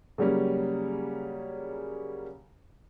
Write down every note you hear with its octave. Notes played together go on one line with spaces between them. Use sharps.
C#3 F#3 G3 A#3 C#4